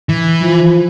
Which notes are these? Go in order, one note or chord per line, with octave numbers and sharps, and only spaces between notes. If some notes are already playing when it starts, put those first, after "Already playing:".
E3
F3